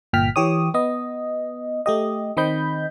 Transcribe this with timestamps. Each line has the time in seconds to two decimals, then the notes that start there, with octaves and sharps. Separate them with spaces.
0.13 G1 A#2 G5 F6 B6
0.36 E3 G4 C#5 D#6
0.74 B3 D#5
1.86 A3 G4 D#5
2.37 D#3 C4 D#5 B5 G6